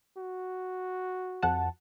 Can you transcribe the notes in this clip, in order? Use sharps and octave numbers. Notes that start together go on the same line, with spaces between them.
F#4
F2 F#5 A5